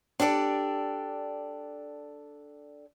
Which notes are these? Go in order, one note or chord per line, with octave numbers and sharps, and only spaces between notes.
D4 G4 A4 D5